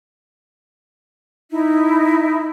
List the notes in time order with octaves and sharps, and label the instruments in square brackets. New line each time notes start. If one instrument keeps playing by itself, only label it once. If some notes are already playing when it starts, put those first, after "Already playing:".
[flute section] D#4 E4